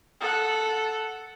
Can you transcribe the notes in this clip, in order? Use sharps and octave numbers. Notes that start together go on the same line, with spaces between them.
A4 F#5